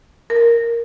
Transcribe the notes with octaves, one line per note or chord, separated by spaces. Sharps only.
A#4